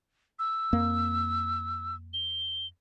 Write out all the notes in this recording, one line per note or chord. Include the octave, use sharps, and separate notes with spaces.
E6
F2 A#3
G7